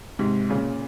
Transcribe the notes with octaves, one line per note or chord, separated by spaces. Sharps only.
G#2 C3
A#2 C#3